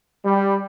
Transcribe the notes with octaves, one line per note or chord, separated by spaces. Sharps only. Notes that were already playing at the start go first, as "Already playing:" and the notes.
G3